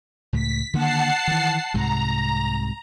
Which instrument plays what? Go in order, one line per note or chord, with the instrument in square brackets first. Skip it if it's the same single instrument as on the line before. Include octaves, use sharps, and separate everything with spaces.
[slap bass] C#2 A2 [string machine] B6
[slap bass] D3 D#3 A#3 [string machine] F#5 A5 C7
[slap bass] D#3 E3
[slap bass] C2 G#2 C3 [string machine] A#5